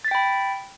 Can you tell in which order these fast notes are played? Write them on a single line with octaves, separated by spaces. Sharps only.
A6 B6 G5 B5